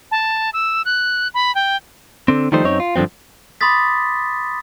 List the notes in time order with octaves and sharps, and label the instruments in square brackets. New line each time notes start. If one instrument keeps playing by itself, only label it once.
[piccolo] A5
E6
F#6
B5
G5
[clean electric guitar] D3 C4
D#3 F3 G3 A3 D#4 C5
F#2 C4 D#4 C#5
F4
G2 D3 F3 F#3 C4
[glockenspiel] B5 C6 D6 D#6 A6 B6